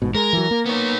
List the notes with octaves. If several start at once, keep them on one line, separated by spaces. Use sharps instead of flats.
A1 G#2 B2
G#3 A#4
E3 F#3
A#3
B3 C#5